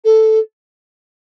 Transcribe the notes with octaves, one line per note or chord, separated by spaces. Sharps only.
A4